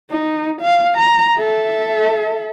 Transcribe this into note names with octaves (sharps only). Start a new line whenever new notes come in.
D#4
F5
A#5
A4 E5